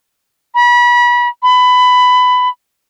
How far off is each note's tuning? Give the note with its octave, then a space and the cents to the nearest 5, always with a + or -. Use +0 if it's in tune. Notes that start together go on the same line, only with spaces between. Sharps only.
B5 -30
B5 +15